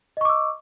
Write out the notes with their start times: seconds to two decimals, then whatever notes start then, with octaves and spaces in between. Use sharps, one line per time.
0.17 D#5
0.21 C#6
0.25 D6
0.29 E6